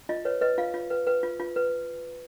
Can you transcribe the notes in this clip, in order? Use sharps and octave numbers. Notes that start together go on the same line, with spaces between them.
F4 D#5
B4 C#5
B4 D#5
F4 F5
F4
B4
B4
F4
F4
B4